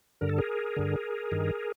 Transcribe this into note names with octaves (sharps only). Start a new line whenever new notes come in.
G2 D3 A#4
A4
G#4 A#4
G2 D3
G2 D#3